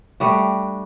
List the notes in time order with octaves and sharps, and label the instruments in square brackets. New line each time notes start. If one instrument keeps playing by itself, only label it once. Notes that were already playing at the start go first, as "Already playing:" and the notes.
[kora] G3 A3 D4 F#4